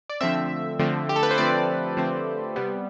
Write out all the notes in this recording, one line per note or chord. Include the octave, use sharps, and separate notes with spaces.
D5
D3 F3 A3 C4 E5
D3 F3 A3 C4
G4
A4
B4
C5
D3 F3 A3 C4 D5
D3 F3 A3 C4
C3 G3 B3